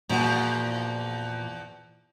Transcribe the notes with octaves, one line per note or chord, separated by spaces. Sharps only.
E2 A#2 F3 F#4